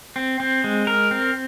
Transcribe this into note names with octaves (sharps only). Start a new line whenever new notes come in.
C4
C4
G#3
A#4
C4